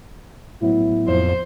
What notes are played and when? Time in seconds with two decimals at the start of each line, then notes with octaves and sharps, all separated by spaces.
0.62 A2 F#3 B3 E4
1.08 F2 C5